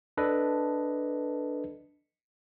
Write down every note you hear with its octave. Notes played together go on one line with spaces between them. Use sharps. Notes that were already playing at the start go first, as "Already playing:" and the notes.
D4 A4 B4 D#5